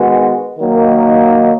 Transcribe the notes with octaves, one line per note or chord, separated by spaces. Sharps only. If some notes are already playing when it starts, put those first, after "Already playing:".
Already playing: D#3 G#3 B3 F#4
D#3 F#3 A#3 D#4